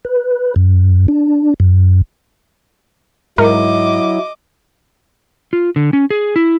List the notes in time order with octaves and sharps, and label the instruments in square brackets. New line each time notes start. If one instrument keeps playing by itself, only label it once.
[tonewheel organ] B4
F#2
D4
F#2
[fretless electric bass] G#2 [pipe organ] F#3 E4 [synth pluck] A#4 [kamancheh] D#5 D6
[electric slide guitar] F4
D3
C#4
G#4
E4